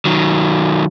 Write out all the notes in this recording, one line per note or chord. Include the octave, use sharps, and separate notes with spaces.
D#3 F#3